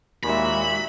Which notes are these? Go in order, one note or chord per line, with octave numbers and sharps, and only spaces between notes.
D#2 A#2 G#3 F#4 E5 B5